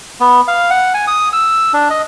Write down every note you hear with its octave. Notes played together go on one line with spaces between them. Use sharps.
B3
F5
F#5
G#5
D#6
E6
D4
D#5